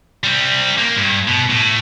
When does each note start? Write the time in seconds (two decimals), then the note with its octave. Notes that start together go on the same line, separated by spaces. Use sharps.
0.24 G3 C4
0.78 A#3
0.96 G2
1.28 B2
1.50 A2